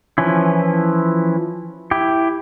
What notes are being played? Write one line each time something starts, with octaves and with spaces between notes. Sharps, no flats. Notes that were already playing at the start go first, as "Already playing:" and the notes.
E3 F3 C#4 E4
E4 G4